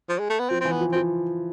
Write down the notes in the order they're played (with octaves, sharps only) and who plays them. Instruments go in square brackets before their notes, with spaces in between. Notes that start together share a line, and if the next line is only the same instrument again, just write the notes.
[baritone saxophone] F3
G#3
A3
B3
[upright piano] F3 [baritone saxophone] C4
[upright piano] E3 [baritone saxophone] C4
[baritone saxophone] B3
[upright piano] F3
[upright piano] F3 [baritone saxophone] C4